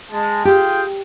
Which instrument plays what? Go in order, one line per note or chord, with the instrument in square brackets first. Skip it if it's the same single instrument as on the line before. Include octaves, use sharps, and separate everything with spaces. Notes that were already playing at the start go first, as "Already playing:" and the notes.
[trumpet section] G#3 A5
[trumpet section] F4 G#4 G5 [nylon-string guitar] G4